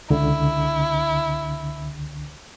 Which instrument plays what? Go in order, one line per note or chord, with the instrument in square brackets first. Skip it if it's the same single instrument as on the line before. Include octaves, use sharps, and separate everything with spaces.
[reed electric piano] C#2 D3 [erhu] E4